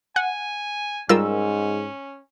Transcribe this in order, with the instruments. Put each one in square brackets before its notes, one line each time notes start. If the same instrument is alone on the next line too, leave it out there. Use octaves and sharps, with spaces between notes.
[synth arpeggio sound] F#5 [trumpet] G#5
[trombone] G#2 [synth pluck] G3 F4 [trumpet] C#4 [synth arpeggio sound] A#4 E6